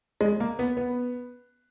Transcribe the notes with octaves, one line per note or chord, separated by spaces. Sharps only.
G#3
A#3
B3
B3